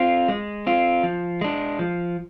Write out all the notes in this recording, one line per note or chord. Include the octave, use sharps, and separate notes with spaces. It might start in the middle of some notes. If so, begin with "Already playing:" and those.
Already playing: C4 F4
G#3
C4 F4
F3
G#3 D4
F3